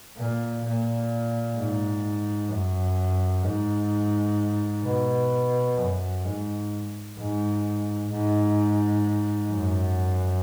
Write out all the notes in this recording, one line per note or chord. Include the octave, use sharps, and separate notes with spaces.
A#2
A#2
G#2
F#2
G#2
B2
F#2
G#2
G#2
G#2
F#2